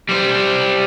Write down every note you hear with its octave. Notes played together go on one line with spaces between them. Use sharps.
G3 C5